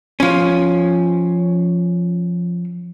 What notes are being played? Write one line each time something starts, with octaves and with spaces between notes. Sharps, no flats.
F3 C#4